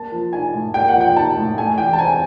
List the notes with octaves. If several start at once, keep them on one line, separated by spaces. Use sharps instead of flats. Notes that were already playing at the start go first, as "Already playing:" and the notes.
Already playing: A#3 A5
F3
D#4 G#5
A2
A#3 G5
F#5
F3
G5
D#4 A5
A2
A3 G#5
E3 G5
A5
C4 G#5